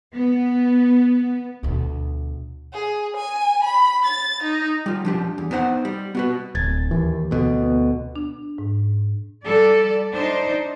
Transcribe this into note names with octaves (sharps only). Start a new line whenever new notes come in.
B3
D2 B2
G#4
G#5
B5
A6
D#4
G3 F4
F3 D4 G4
E2
B3 D#4 C5 F#5
G3
B3 F#4 B4
D1 G#6 A6
D#2 E3
D2 B2
B3
D4
G#2
G3 A4 D5
D4 D#4 C5